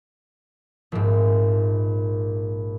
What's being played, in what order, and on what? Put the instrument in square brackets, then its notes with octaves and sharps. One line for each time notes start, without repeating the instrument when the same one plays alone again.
[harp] A#1 G#2